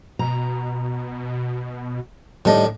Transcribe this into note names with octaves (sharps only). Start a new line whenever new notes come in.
B2 A#5
A2 D#3 G3 D4 D#5